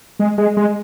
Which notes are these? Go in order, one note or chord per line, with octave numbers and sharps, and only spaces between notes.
G#3
G#3
G#3